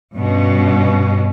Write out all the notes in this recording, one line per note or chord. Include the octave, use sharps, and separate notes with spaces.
G2 B2 C#4